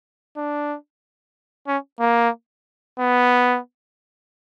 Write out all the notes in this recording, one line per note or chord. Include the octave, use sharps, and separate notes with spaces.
D4
C#4
A#3
B3